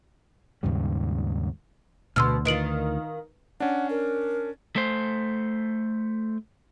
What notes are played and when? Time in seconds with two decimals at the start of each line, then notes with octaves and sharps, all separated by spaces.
0.63 D#2 G#2 C#3 G3
2.16 D2 B2 C6 E6 F6
2.45 D#3 F4 B4 D7 F#7
3.60 C#4 D4 F#5
3.90 A#4
4.76 A3 C5